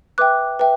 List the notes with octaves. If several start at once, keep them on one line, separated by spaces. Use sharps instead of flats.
B4 E5 G5 D6 F#6
B4 E5 G5